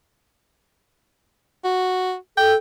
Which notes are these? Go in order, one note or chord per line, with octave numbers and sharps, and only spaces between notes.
F#4
A4 G5